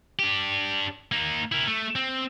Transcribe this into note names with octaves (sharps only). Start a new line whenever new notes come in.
D4 G4
A#3 D#4
E4 A#4
A3
C4